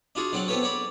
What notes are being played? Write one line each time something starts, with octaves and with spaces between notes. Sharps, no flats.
D4 F4 F#4 G#4
D3 F#3 C4 D5 F#5
B3 C4 F4 A4 B4 C#5
C#5 D5 B5